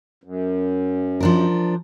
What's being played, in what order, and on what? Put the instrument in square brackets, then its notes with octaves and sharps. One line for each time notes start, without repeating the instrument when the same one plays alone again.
[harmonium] F#2
[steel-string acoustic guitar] F3 D4 A#4